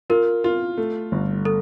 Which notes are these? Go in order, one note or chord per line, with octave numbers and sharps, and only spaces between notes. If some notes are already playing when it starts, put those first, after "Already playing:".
F4 A#4
F4
A3
G1
A4